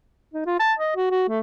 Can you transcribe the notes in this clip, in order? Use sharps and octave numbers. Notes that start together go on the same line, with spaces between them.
D#4
F4
A5
D#5
F#4
F#4
A3